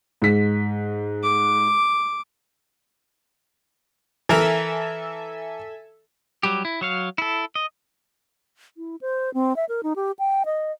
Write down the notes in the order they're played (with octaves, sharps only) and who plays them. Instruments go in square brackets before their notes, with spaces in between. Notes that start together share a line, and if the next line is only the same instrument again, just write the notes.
[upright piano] G#2 B6
[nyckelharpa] D6
[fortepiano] E3 A#4 [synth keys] A4 E5 G#5
[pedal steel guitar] F#3 G3 G4
E4
F#3 C#5 F5
E4 A4
D#5
[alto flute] E4
C5
C4
E5
A#4
D#4
G4
G5
D#5